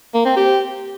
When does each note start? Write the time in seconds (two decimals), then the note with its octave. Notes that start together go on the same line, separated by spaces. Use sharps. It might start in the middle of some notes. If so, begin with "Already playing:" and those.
0.14 A#3
0.25 C4
0.37 G4